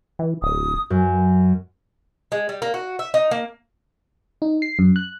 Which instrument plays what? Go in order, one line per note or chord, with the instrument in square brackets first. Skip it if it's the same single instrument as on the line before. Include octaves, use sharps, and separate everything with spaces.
[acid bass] E3
[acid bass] D1 [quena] D#6
[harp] F#2
[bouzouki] G#3
G3
A#3
F#4
E5
D#4
A#3
[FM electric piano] D#4
C7
F#2
F#6